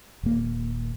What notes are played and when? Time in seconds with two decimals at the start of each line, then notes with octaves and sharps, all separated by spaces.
0.23 D#1 A#3